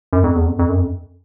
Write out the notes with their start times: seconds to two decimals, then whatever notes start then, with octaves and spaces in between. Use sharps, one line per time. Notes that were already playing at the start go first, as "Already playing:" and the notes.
0.13 F#2
0.24 F2
0.36 E2
0.47 F2
0.59 F2
0.69 F#2
0.79 F2